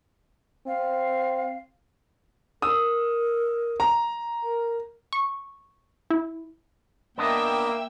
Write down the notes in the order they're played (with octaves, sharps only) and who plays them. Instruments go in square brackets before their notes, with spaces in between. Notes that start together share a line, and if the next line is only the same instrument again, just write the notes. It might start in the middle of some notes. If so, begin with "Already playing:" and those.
[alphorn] C4 [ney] F5
[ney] A#4 [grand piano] D#6 E6
[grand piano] A#5
[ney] A#4
[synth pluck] C#6
E4
[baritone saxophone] A#3 [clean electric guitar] B3 D4 D#5 [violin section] E5 G5 E6